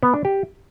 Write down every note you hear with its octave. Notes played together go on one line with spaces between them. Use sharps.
B3
D4
G4